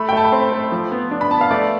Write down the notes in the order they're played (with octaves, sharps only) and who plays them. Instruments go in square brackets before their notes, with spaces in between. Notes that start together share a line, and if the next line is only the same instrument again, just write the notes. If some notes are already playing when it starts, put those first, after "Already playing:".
Already playing: [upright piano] A3 B5
G5
A3 A5
B5
C4 C6
A3
F3
B3
D4
B5
B3 A5
F5
A3 D5